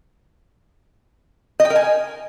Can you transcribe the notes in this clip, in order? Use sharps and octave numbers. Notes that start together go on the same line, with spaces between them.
D#5
G5
A#4
G#5